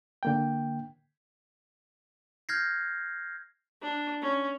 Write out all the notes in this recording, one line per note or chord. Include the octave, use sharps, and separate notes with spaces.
D3 A#3 G5
F6 G6 G#6 A#6 C7
D4
C#4